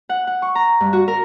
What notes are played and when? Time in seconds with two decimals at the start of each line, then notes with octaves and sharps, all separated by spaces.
0.09 F#5
0.27 F#5
0.42 C#6
0.55 A#5
0.80 G2
0.93 F#4
1.08 A#4